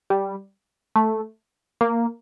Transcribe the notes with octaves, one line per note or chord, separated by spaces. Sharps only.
G3
A3
A#3